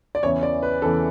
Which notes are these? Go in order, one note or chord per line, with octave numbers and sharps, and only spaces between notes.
D5
E2 C#3 E3 C#5
D5
B4
E2 C#3 E3 A4